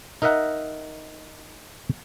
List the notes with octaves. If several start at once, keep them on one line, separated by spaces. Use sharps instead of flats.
D#4 A#4 D#5 E5 F#5 A#5